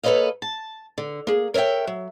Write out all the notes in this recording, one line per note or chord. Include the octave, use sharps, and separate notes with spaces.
A#3 A4 B4 C#5 D#5 F5
A5
D3
A#3 G#4
A#4 C#5 D#5 E5 G5
F#3